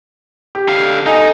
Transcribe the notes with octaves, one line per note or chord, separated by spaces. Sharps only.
G4
D3 F5
D#4 A4 D#5 G#5